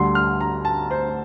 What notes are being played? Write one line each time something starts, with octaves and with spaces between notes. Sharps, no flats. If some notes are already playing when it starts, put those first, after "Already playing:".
Already playing: D2 D3 G3 C6
F6
A#5
A5
C5